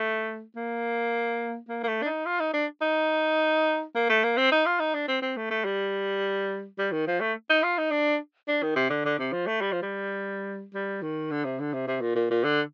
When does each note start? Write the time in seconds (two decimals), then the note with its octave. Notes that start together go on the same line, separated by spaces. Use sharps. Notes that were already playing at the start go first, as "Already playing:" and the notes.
Already playing: A3
0.56 A#3
1.69 A#3
1.83 A#3
1.88 A3
2.02 D4
2.06 D#4
2.26 F4
2.40 D#4
2.53 D4
2.81 D#4
3.95 A#3
4.09 A3
4.24 A#3
4.37 C4
4.52 D#4
4.66 F4
4.80 D#4
4.94 D4
5.08 C4
5.22 C4
5.37 A3
5.50 A3
5.64 G3
6.78 G3
6.92 D#3
7.07 F3
7.20 A3
7.49 D#4
7.63 F4
7.78 D#4
7.91 D4
8.48 D4
8.62 D#3
8.76 C3
8.90 D3
9.05 D3
9.19 C3
9.32 F3
9.47 A3
9.61 G3
9.72 F3
9.82 G3
10.74 G3
11.02 D#3
11.31 D3
11.44 C3
11.60 D3
11.73 C3
11.87 C3
12.01 A#2
12.15 A#2
12.31 A#2
12.44 D3